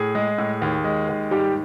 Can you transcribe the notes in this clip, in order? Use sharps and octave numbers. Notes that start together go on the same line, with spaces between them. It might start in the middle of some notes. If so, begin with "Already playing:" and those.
Already playing: A2 G#4
G#3
A2
D#2
G#3
D#2
G#2 G3 G4